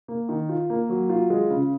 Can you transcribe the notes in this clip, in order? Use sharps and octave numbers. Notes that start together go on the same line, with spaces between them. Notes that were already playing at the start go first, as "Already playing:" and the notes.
A#3
D#3
F4
A#3
F#3
F4
G#3
C#3